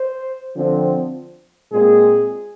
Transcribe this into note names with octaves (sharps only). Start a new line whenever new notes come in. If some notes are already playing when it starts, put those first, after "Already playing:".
Already playing: C5
D3 F3 C4
A#2 G#3 C4 G#4